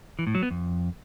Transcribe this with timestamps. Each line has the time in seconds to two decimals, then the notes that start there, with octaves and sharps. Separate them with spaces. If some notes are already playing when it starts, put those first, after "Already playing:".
0.19 E3
0.27 A2
0.35 F#3
0.43 B3
0.51 F2